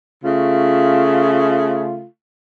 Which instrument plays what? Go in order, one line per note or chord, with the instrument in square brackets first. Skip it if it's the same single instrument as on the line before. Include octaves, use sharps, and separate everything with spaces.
[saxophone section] C#3 A3 F4